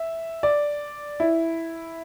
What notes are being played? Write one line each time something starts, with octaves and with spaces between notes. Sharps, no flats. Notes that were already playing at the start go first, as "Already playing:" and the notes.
Already playing: E5
D5
E4